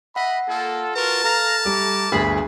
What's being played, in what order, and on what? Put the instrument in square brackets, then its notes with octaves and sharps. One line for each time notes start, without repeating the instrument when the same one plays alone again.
[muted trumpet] D#5 [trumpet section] E5 B5 [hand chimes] F#5
[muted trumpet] A#3 [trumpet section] F4 A4
[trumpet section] F4 F#4 A#4 [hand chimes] B4 [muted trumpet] A5
[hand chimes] A4 F6 A#6 [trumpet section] F5 A#5
[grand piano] G3 [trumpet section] A3 A#5 D6
[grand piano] G1 D2 G#4 [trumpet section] B5